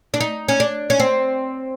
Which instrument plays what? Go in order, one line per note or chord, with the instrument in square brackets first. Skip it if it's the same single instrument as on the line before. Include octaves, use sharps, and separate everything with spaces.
[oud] D4
D#4
C#4
D4
C#4
C4